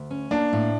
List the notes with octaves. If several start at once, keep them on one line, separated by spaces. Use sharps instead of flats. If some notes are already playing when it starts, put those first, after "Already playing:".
Already playing: D2
C#4
A#3 D4
A2